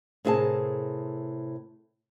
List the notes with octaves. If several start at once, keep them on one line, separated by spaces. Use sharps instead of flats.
A2 C3 E4 G#4 A#4 A5